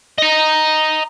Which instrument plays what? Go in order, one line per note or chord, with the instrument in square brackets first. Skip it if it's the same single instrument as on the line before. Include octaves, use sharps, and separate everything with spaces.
[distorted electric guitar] D#5 A#5